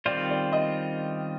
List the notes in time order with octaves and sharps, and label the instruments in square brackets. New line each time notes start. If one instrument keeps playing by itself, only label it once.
[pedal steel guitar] D#3 G3 C4 F4 C5 [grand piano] D5
[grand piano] D5
D#5